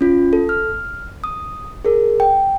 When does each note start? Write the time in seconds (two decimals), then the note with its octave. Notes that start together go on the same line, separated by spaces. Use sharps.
0.01 C#4 F4
0.33 A4
0.49 F6
1.24 D#6
1.85 G#4 A#4
2.20 G5